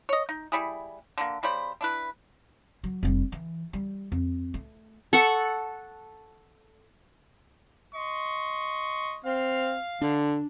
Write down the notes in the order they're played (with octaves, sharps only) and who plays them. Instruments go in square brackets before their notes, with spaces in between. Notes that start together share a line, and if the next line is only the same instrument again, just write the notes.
[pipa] C#5 D#5
D#4
G3 E4 G#4
D3 A#3
C#3 G3 C5 B5
D4 E4 B4
[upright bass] F#3
F1 G3
E3
G3
F2
A3
[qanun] A4 F#5 C#6
[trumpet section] D#5 C6 C#6
[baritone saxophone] C4 [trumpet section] F5
[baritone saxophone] D3 [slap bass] D4